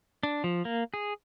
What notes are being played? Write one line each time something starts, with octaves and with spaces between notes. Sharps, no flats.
D4
F3
A#3
G#4